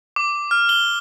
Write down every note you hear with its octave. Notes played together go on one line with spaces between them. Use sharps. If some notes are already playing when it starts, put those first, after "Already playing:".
D6
F6
G7